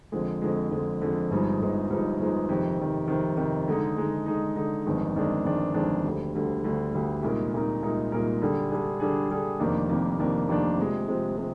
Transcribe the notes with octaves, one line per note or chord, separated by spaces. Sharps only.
F2 D3 F3 G#3
F2 D3 F3 G#3
F2 D3 F3 G#3
F2 D3 F3 G#3
G1 G2 F3 G#3 D#4
G1 G2 F3 G#3 D#4
G1 G2 F3 G#3 D#4
G1 G2 F3 G#3 D#4
F2 C3 D#3
F2 C3 D#3
F2 C3 D#3
F2 C3 D#3
D3 G#3 D#4
D3 G#3 D#4
D3 G#3 D#4
D3 G#3 D#4
G1 F2 D#3 G#3 D4
G1 F2 D#3 G#3 D4
G1 F2 D#3 G#3 D4
G1 F2 D#3 G#3 D4
D2 D3 G3
D2 D3 G3
D2 D3 G3
D2 D3 G3
C2 A#2 G#3 D#4 A#4
C2 A#2 G#3 D#4 A#4
C2 A#2 G#3 D#4 A#4
C2 A#2 G#3 D#4 A#4
D3 G3 D4 G#4
D3 G3 D4 G#4
D3 G3 D4 G#4
D3 G3 D4 G#4
F1 F2 D#3 A#3 D4
F1 F2 D#3 A#3 D4
F1 F2 D#3 A#3 D4
F1 F2 D#3 A#3 D4
C3 F3 G#3
C3 F3 G#3
C3 F3 G#3